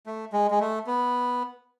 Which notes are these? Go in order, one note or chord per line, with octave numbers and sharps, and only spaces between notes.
A3
G#3
G#3
A3
B3